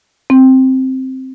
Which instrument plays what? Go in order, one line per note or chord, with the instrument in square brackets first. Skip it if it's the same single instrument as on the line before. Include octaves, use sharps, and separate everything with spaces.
[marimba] C4